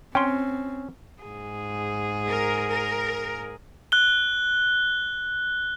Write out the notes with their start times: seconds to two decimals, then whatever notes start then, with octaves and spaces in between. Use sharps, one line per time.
0.15 C4 C#4 G5 C6
1.23 G#2 G#4
2.29 A#4
2.70 A#4
3.92 F#6 G7